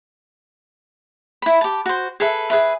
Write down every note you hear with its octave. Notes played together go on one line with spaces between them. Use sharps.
E4 B5
G4 A5
F#4 C5
G#4 A4 B4 E5
G#4 B4 E5